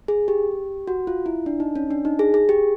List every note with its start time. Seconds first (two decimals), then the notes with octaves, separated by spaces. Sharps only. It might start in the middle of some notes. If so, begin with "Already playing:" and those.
0.08 G#4
0.28 G4
0.88 F#4
1.07 F4
1.26 E4
1.46 D4
1.60 D#4
1.76 C#4
1.91 D4
2.05 D#4
2.19 G#4
2.34 G#4
2.49 G4